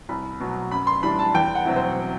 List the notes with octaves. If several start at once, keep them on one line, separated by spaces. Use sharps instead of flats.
C2 B5
B2 F#3
F#2 B5
C6
E3 G3 D4 B5
A5
E2 G5
F#5
B2 F#3 C4 E4
C5